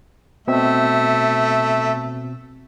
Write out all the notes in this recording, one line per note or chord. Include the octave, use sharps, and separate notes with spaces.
B2 A3 C4 E5